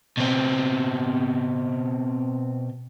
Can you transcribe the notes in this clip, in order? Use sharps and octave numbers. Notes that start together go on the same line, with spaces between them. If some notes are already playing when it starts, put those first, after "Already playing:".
B2 C4